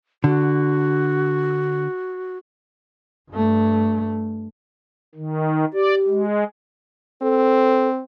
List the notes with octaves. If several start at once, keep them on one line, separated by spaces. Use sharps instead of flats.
D3 F#4
G2 A3
D#3
G4 D5
G#3
C4 A4